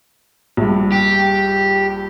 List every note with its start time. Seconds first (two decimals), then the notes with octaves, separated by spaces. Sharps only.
0.57 A#1 G2
0.92 G4